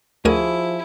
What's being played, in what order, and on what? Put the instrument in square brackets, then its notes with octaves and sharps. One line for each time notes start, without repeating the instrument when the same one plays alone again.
[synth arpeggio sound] D2 A#4 D#7 [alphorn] F3 [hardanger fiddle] E4 [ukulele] F#4 G#4